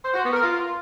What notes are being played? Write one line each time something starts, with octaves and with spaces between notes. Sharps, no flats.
C5
F#4
B3
A#4
F4